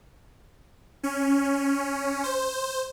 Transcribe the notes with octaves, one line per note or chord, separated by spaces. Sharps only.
C#4
C5